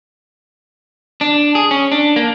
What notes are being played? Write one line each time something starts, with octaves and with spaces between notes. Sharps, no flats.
D4
G#4
C#4
D4
A#3